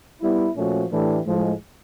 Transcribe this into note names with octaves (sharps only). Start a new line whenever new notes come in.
G3 B3 E4
A#2 F3 A3 C#4 F#4
A2 E3 A3 D4 G4
A2 F3 G#3